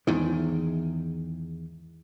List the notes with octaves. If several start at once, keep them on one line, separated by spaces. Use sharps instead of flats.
E2 G#2 D#3